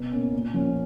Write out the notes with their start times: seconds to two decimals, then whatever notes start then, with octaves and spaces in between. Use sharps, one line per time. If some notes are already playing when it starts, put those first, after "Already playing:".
Already playing: B2
0.12 A#3 C#4
0.33 A#2
0.54 F3 A#3 C#4